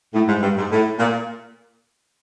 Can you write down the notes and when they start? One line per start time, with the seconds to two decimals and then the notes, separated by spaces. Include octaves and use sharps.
0.14 A2
0.27 G#2
0.41 G2
0.56 G#2
0.70 A2
0.98 A#2